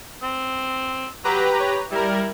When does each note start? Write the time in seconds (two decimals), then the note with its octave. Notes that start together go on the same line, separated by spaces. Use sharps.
0.23 C4
1.24 F#3 G4 B4 A#5
1.60 C#5
1.91 G3 E4 A#4